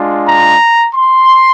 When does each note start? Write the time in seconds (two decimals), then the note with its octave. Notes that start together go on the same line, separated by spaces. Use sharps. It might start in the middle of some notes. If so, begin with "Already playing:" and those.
Already playing: G#3 D4 F4
0.27 A#5
0.94 C6